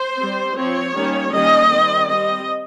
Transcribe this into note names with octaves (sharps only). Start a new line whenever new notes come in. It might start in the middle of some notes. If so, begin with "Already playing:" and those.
Already playing: C5
G3 C4
F3 C4 C#5
D#3 G3 A#3 C#4
D#3 G3 A#3 C#4 D#5
D#3 G3 C4
G3 C4 D#5